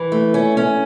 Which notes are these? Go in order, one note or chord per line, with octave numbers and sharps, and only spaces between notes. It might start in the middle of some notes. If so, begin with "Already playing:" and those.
Already playing: E3
A3
C#4
C#4